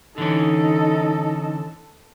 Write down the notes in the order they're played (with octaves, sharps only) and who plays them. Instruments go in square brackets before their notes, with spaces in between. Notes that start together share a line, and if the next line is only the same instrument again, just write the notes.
[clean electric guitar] D3 E3 C#4 [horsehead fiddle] D#4 D#5 [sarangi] A4